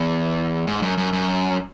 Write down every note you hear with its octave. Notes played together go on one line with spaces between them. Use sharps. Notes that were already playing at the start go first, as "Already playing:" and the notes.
Already playing: E2
G#2
F#2
F#2
F#2